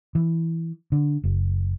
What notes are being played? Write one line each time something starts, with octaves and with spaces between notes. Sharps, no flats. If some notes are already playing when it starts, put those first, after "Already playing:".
E3
D3
F#1